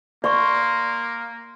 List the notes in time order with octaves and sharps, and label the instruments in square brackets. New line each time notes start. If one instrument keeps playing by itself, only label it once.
[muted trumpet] A#3 [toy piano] D5 C#6 [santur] C6